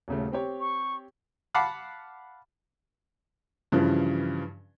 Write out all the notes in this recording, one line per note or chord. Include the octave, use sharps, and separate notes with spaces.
D#1 C#3 A3
C4 G4 C#5
C#6
F5 F#5 A5 B5 D6
G2 C#3 E3 F3